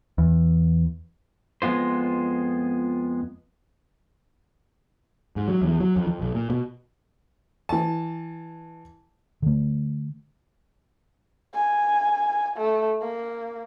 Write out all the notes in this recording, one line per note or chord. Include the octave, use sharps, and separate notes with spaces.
E2
F2 G#3 B3 F4 C5
G#2
F#3
E2
F#3
F2
F2
B1
A#2
B2
E3 A5
D3 A3
G#5
A3
A#3